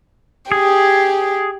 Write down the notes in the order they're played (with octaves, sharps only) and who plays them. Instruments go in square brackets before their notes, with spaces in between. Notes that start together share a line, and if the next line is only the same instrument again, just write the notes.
[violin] G4 [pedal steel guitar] G#4